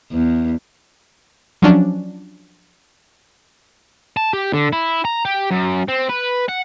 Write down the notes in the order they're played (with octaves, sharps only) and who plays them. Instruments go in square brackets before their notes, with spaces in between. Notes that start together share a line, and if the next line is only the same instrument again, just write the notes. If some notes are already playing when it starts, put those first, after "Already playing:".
[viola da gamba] E2
[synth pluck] F3 F#3 C#4 D4
[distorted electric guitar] A5
G4
D3
E4
A#5
G4
F#2
C4
B4
F#5